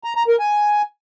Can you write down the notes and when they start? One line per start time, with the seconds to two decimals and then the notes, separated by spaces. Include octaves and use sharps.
0.04 A#5
0.16 A#5
0.28 A#4
0.39 G#5